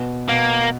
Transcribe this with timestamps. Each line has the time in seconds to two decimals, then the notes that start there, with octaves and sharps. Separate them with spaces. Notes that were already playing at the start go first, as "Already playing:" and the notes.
Already playing: B2
0.28 B2 A#3